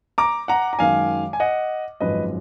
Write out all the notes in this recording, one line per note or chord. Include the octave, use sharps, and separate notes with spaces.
A#5 D6
F#5 A#5
A#5
F#2 D#3 G#3 F5 G#5
G#5
D#5 F#5
G#1 F#2 F3 G#3 B4 D#5